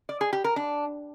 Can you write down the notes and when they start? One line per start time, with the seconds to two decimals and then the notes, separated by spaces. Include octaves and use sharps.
0.09 D5
0.21 G#4
0.33 G4
0.44 A#4
0.56 D4